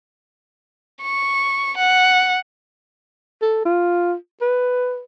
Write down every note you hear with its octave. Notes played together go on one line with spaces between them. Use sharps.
C#6
F#5
A4
F4
B4